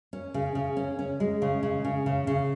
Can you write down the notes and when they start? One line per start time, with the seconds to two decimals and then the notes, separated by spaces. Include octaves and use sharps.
0.13 C#4
0.34 C#3
0.55 C#3
0.77 C#4
0.99 C#4
1.20 G#3
1.42 C#3
1.63 C#3
1.85 C#3
2.06 C#3
2.27 C#3